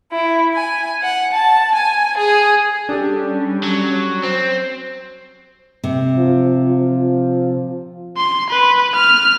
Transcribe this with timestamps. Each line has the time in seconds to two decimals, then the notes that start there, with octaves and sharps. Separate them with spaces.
0.12 E4
0.53 G#5
1.02 F#5
1.32 A5
1.75 G#5
2.16 G#4
2.89 G3 C#4 D4 G4 A4
3.63 F#3
4.23 C4
5.84 C3
6.17 F3
6.68 F3
8.17 C6
8.50 B4
8.96 F6